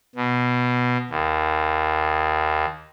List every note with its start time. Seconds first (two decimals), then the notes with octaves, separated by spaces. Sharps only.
0.16 B2
1.10 D#2